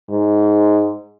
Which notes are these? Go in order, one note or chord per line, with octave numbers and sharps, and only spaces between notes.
G#2